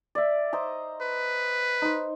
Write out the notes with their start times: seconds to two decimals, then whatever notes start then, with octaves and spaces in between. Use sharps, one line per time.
0.15 D5 E5
0.53 C5 D#5 A#5
1.01 B4
1.82 D#4 C5